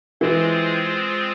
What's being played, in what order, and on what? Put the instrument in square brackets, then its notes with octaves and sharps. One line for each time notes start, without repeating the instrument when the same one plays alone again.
[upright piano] E3 [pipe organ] G#3 C4 F4 G#4 C5